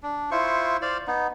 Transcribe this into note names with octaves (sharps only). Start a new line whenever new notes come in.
D4
E4 F4 C5 C#6
C5 D5 F5
B3 D#4